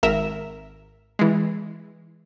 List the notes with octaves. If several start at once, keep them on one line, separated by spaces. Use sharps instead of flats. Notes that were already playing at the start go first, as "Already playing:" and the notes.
G#1 A#4 E5 E7
E3 G#3